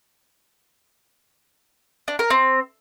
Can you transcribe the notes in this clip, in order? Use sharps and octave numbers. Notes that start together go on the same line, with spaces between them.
D4
A#4
C4